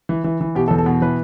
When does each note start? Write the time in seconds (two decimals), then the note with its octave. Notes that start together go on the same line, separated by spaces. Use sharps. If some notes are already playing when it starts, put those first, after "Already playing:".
0.09 E3
0.24 E3
0.41 E3
0.55 B2 G4
0.68 A4
0.71 E2
0.78 A4
0.86 B2
1.01 E3 B4